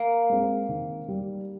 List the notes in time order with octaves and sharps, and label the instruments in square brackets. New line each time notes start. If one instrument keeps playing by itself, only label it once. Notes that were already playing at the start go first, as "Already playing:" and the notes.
Already playing: [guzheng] A#3
[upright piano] G#3 C4
D#3
G3